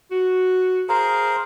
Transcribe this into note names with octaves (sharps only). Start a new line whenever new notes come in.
F#4
G#4 A#4 C5 F5 A#5